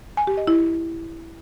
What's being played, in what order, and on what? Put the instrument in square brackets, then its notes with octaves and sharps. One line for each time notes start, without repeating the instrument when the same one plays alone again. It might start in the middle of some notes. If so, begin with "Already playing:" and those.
[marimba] G#5
G4
D#5
E4